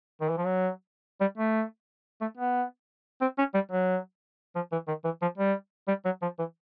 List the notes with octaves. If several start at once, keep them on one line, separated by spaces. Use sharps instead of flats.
D#3
E3
F3
F#3
G3
A3
A3
B3
C4
C#4
G3
F#3
F3
E3
D#3
E3
F3
G3
G3
F#3
F3
E3